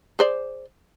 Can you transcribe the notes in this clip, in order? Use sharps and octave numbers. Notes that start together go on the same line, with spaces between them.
G#4 C5 D5